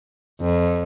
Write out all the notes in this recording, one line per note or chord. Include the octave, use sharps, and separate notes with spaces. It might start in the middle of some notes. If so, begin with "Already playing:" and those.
F2